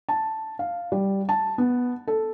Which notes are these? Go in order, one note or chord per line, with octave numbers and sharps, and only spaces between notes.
A5
F5
G3
A5
B3
A4